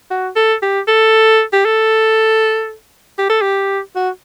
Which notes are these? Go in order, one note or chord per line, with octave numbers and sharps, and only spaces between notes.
F#4
A4
G4
A4
G4
A4
G4
A4
G4
F#4